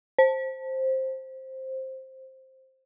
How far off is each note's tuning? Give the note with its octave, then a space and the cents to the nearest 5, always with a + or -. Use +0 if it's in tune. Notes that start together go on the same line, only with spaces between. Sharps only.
C5 +10